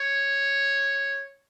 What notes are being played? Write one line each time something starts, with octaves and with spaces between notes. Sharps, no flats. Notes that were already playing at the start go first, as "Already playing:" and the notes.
Already playing: C#5